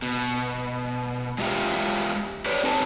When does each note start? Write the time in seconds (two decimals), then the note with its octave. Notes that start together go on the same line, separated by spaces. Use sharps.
0.02 B2
1.38 G#3 F4 G4 E5 F5 G5
2.45 G4 B4 C#5 D5
2.64 C4 D#4 A4 C#5 G#5 A5